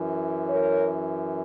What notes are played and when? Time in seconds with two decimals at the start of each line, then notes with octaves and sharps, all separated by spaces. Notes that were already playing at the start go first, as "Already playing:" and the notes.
Already playing: F#2 E3
0.49 A#4 C#5